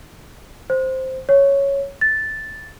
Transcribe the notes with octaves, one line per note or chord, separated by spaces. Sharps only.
C5
C#5
A6